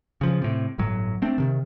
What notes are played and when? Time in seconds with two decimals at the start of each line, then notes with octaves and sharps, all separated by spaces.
0.21 C#3 F3
0.42 A2 C3
0.78 G1 A2 F#3
1.22 A3 C4 D4
1.38 C3 D#3